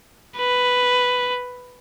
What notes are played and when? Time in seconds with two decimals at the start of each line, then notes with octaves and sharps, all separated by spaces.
0.38 B4